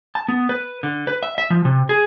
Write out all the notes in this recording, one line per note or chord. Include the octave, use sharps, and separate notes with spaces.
A5
B3
B4
D3
B4
E5
E5
F3
C3
G#4